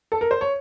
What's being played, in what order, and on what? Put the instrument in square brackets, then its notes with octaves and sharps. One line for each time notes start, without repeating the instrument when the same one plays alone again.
[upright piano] A4
A#4
C5
C#5